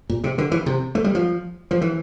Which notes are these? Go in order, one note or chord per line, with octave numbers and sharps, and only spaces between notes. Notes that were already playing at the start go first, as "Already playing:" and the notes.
A#2
C3
D3
E3
C3
A3
G3
F3
F3
E3